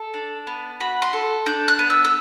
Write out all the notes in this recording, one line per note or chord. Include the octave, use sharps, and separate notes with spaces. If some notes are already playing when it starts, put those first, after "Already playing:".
Already playing: A4
D4
B3
F#4 B5
C6
A4
D4 G6
F#6
B3
E6
E6